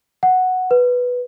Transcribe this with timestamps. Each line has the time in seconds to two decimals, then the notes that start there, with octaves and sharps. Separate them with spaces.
0.23 F#5
0.71 B4